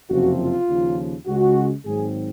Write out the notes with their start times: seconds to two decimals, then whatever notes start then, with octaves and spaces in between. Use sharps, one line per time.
0.10 F#1 F2 C3 F3 C4 F#4
0.40 F4
0.69 D#2 C#3 F3
1.27 C#2 C#3 G#3 F#4
1.85 G#1 G#2 F#3 C4 G#4